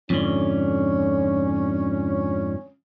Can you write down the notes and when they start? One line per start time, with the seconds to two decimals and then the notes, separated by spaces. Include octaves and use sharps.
0.10 F2 G#2 D3 C#4